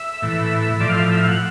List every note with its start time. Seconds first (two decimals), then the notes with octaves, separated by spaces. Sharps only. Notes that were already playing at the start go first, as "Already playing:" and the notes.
Already playing: E5
0.22 A2 E3
0.80 A2 F3 D5
0.90 F5
0.99 E5
1.09 E5
1.18 F5
1.28 F#5